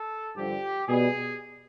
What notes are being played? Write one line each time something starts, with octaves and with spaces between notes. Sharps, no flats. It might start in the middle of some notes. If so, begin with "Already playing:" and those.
Already playing: A4
G2 D3 F3 G4
B2 G3 B3 G#4